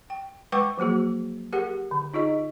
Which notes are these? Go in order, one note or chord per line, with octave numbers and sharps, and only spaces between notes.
G5
G#3 B4 F#5 G5 C#6 D6
F3 F#3 A#3 F#4 G#4
G4 G#4 A#4 F#5
D3
D#4 F4 G#4 D#5